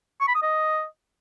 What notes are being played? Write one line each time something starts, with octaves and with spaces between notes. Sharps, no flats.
C#6
B5
D#6
D#5